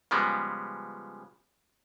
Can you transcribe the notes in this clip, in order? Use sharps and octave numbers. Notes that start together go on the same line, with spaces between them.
C#3 F3 G3 G#3 B3